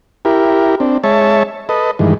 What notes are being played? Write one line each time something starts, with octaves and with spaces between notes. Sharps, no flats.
E4 G4 A#4
C4 D4
G#3 C#5 E5 A5
A4 B4 D#5
G2 D#3 E3 G#3